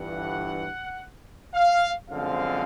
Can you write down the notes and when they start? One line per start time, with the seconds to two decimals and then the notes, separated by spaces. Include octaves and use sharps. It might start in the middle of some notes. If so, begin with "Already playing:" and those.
Already playing: G1 G2 E3 F#5
1.54 F5
2.10 F#2 D3 F3 G#3 C4 F5